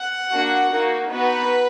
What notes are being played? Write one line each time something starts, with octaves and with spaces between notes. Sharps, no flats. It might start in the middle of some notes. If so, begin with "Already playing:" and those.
Already playing: F#5
A#3 D4 F#4
A#3 D#4 F#4
B3 D#4 F#4 B4